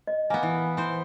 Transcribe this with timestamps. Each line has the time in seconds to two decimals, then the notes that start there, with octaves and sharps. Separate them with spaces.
0.07 D#5
0.30 A#3 B3 G#5
0.43 E3
0.77 E3 C5